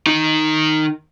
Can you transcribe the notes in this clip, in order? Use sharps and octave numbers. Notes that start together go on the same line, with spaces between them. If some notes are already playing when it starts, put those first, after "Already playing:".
D#3 D#4